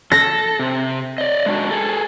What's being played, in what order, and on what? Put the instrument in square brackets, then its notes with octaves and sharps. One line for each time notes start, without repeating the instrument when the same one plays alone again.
[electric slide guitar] A4 [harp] A#6
[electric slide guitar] C3
D5 D#5
G#3 D4 F#4
G#4 A4